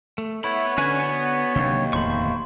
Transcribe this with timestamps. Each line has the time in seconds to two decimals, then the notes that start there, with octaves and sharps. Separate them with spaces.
0.18 A3
0.44 B3 E4 C#5 B5
0.78 D3 C#4 F#4 B4 G#5
0.98 B3
1.56 D#2 C3 F#3 D4
1.93 D1 E2 A3 C5 B5 C#6